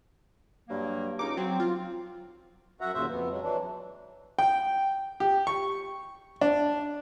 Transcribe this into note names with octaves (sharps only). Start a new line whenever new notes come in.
G2 F#3 A#3
C#2 D#4 D6
F#3 C4
F4
F#2 F#4 E5 F#5 A#5
D#2 A#2 C#3 F#4 C5 E5
F2 B3
F#3 G#3
E3 F#3 D4
G5
G4
C#6
D4